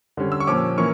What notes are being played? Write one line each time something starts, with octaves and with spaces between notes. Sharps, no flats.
D3 G3 C#4
E6
C#6
A#2 F3 C#4 D6
E3 A#3 C#4 C#6